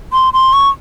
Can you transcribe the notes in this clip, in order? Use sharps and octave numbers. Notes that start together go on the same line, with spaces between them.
C6
C6
C#6